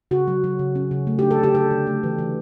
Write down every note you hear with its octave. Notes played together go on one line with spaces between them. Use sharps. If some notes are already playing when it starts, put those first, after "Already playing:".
C#3 F#4
F#3
F#3
C#3
C#4
C#3
A3
G4
D4
A4
D3 G4
D4 A4
D3
A3
E3
E3